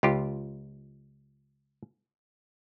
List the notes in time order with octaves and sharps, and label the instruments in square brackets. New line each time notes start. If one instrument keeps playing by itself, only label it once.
[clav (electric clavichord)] C#2 F4 G4